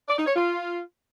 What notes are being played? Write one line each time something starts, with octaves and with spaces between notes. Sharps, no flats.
D5
D#4
C#5
F4